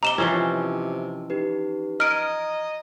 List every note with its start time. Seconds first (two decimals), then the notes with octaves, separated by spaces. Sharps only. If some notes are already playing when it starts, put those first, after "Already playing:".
0.03 C3 C5 D#5 A#5 D6 E7 G7
0.18 C3 E3 F3 C#4 E4 D#5 E6
1.30 D#4 G4 B4
2.00 D#5 A#5 D#6 F6 G#6 D7